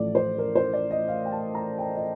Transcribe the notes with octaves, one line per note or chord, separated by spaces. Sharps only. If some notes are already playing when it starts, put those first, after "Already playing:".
Already playing: A1 A2 F3 A3 D5
C5
A#4
C5
D5
D#5
F5
G5
A5
A#5
G5
D#5